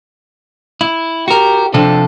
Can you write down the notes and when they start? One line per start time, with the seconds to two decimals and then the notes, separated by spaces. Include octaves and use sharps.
0.81 E4
1.28 F#4 G4 A#4
1.74 C3 F3 C4 D4 A4